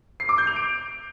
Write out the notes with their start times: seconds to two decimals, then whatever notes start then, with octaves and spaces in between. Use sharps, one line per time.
0.20 C7
0.29 D6
0.38 G6
0.47 F7
0.56 D7